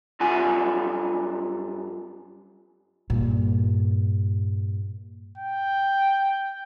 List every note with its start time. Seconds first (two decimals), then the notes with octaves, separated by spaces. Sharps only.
0.20 G2 F#3 F4 F#5 G#5
3.10 G2 A#2
5.38 G5